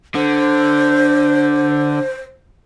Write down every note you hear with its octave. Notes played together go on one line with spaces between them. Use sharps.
D3 C5